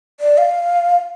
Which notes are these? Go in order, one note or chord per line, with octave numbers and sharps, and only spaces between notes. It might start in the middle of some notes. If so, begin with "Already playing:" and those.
D5
F5